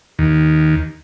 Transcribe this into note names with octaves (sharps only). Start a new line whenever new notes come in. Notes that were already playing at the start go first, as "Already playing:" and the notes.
D#2